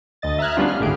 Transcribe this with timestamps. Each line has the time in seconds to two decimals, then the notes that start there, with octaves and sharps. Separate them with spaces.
0.22 D2 D#5 A6
0.39 E5 A#5 F6 F#6 G#6
0.57 G3 B3 C#4 D4 F4
0.68 F6
0.80 G#1 D2 A2 G4 G#4 D7